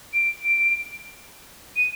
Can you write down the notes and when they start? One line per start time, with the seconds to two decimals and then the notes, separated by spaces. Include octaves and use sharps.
0.14 D7
1.77 D#7